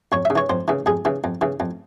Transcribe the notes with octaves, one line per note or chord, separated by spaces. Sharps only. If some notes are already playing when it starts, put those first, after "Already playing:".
F2 C#5
C#3 E5
E3 C#5
F2 C5
C#3 E3
F2 G#4
C#3 E3
F2
C#3 E3
F2